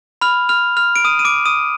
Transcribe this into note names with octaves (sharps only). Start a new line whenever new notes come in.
B5 F6 F7
F6 F7
F6 F7
D7
D#6 D#7
D#7
D6 D7
D#6 D#7